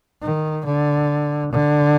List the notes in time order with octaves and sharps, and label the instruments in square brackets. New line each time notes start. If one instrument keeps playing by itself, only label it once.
[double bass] D#3
D3
D3